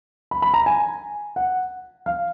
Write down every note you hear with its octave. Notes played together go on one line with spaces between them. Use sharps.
B5
B5
A#5
G#5
F#5
F5